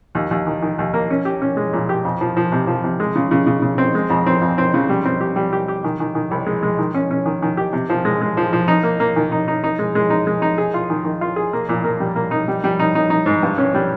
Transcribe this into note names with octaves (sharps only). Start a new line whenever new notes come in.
D#2
D#2
D#3
D#3
D#2
A#3
C#4
G4
C#4
G#3
A#2
G4
F2
F3
F3
C3
F3
C3
G#3
C#3
C#3
C#3
C#3
C4
G#3
F2
C4
F2
C4
C#3
G3
C4
G4
G3
G4
G4
D#3
D#3
D#3
C2
G#3
G#3
D#3
C#4
C#4
D#3
D#3
G4
C3
F3
G#3
G#3
F3
F3
D#4
A#3
A#3
D#3
D#4
D#4
D#4
G#3
G#3
D#4
G#3
D#4
G#4
F4
D#3
D#3
F4
G#4
A#3
A#2
A#3
G3
A#3
D#4
G3
G3
D#4
D#4
D#4
G#2
G2
C#4
G3